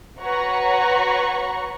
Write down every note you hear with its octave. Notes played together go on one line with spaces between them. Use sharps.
F#4 B4 C#5 F#5 A#5 C#6